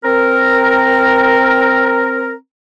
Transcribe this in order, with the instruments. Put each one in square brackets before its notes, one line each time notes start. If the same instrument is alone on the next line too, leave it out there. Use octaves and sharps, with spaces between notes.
[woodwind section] C4 A#4